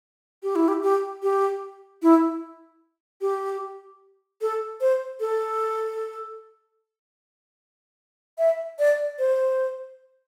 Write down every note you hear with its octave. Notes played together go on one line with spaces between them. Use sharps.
G4
E4
G4
G4
G4
E4
G4
A4
C5
A4
E5
D5
C5